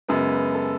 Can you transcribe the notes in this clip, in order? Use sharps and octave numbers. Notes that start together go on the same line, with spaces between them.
F#2 C#3 G#3 B3
B4
A4